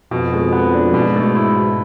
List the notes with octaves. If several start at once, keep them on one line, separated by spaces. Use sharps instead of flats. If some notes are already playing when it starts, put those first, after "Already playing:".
F2 B2
G#3
B3
D4
G#2 B2
A3
E4
B2